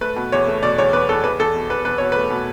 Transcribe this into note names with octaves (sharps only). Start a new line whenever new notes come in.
A3 B4
B2
E2 C#5
A3
B2 D5
E2 C#5
E2 B4
E2 A4
E2 B4
E2 A4
B2
E2 B4
E2 B4
B2 C#5
A3 B4
B2